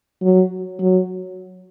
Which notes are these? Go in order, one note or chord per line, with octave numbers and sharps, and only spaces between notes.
F#3
F#3